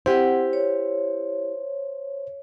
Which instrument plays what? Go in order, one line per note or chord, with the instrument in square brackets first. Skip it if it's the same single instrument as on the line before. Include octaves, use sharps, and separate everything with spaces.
[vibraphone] C4 F#5 [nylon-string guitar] E4 G4 [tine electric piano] C5
[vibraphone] C#5